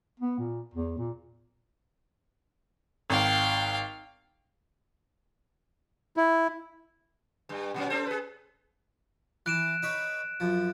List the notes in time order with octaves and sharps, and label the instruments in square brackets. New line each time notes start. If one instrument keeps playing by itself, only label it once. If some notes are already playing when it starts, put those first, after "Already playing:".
[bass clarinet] B3
A#2
E2
A#2
[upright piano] G#1 [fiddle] F5 G5
[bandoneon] E4
[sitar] G2 G3
A#2 F#3 C#4
C#4 A4 C5
G#4 B4
[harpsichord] E3 [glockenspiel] F#6 D7 E7
[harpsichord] D#4 B4 C#5
F#2 F3